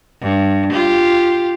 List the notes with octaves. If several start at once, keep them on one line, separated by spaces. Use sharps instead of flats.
G2
F4 G4